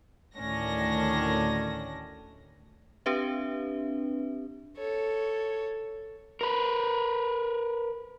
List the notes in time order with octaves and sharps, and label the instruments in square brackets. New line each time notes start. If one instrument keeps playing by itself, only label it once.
[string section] D2 A2 D#3 C#4 D4 A#6
[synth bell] C4 D4 G4 B4 E5
[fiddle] A4 C#5
[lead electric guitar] A#4 B4